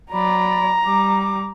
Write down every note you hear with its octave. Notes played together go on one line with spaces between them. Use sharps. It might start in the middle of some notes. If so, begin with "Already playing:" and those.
F#3 D5 A#5 B5
G3 D6